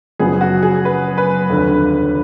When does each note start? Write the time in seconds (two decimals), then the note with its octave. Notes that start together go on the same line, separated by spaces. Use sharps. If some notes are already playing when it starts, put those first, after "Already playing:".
0.19 F#1 F#2 F3 B3 G#4
0.41 F#4
0.63 G#4
0.85 B4
1.18 B4
1.50 F1 D#2 D3